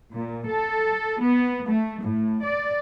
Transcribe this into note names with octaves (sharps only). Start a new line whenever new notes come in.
A#2
A4
B3
A3
A2
D5